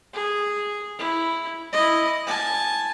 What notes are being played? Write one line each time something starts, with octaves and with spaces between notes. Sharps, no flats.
G#4
E4
E4 D#5
G#5 A5